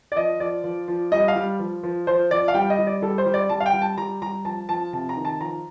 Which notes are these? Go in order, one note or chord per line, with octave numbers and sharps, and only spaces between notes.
D5
F3 D#5
F3 D5
F3
F3
G3 D#5
F5
G3
F3
F3
F3 C5
F3 D5
F5
G3 G5
D#5
G3
D5
G3 A4
C5
G3
D5
G3 A5
F5
G5
G3
A5
G3 A#5
G3 A#5
F3 A5
F3 A5
C3 A5
A#5
D#3
A5
F3 A#5